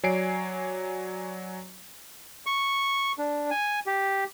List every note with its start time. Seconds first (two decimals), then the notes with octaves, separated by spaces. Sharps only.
0.04 F#3 C#5 D5 G#5 C7 D7
2.46 C#6
3.18 D4
3.50 G#5
3.87 G4